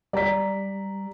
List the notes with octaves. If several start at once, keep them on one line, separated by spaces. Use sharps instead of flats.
G3 D5 A#5 B6